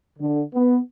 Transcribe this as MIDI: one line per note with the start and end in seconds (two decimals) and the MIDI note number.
0.18 0.41 50
0.54 0.77 59